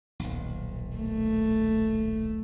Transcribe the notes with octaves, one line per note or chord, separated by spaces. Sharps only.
D#1 B1
A3